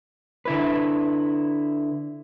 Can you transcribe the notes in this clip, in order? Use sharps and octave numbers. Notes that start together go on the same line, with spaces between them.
D3 E4 B4